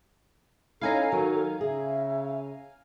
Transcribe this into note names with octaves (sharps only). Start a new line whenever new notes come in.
C#4 D#4 E4 A4 F5 G#5 A#5
D#3 F#3
C#3 G#4 E5